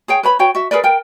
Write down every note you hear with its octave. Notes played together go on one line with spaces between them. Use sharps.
G#4 C#5 G5
B4 C#5 B5
F#4 C#5 G5
F#4 E5
G#4 A#4 B4 D5
A#4 G5